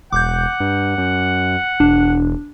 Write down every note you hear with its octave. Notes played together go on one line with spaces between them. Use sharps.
E1 F#5 D6 G6
G2
F#2
E1 D4